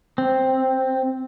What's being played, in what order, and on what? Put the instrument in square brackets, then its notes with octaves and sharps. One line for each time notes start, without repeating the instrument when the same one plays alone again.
[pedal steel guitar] C4